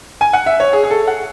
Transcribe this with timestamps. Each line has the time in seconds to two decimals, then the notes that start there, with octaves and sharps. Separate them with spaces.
0.21 G#5
0.33 F#5
0.46 E5
0.60 C#5
0.73 G#4
0.84 G#4
0.90 A4
1.07 F#5